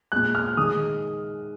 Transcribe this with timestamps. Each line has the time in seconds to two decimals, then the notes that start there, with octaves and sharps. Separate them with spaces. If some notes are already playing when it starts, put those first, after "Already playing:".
0.12 A#2 G#3 F#6
0.35 F6
0.57 D#3 G#3 D#6